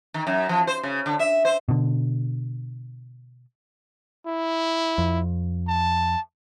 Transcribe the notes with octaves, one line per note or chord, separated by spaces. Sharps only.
D#3
F#2
F3
C5
C#3
D3
E5
C5
B2 D3
E4
F2
A5